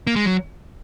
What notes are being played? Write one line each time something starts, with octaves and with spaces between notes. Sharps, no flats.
A#3
G#3
F#3